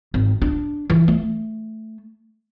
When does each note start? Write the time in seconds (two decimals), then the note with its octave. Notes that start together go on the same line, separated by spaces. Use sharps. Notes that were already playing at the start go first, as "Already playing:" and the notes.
0.14 G#1
0.41 D4
0.90 E3
1.08 A3